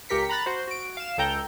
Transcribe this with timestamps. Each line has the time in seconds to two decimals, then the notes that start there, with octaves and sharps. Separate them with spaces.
0.09 C#2 G4 A#4 B6 C#7
0.29 A#5 B5 F#6 A6
0.46 F#4 C5
0.67 F#4 D7
0.97 F5 E7
1.18 C#2 A4 G5 A#5 G6